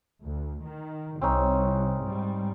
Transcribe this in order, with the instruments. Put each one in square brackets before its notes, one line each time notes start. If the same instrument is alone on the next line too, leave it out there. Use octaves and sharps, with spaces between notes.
[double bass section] D2
D#3
[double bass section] C2 [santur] C4 C#4 D#4
[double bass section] G#2 G3